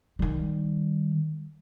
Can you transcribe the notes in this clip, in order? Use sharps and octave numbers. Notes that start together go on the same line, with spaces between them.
D#3 G3